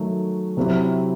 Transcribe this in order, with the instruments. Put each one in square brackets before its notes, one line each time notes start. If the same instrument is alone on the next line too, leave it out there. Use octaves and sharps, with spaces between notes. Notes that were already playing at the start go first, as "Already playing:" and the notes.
Already playing: [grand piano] D#3 F#3 A3
C3 F#3 C4 E4 G4